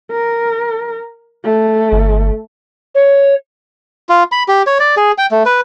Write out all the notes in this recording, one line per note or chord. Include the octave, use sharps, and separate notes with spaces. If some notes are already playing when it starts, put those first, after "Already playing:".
A#4
A3
G1
C#5
F4
B5
G4
C#5
D5
G#4
G5
A3
B4